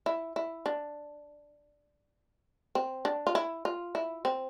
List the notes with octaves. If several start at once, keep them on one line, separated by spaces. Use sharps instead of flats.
E4
E4
D4
C4
D4
F4
E4
F4
E4
C4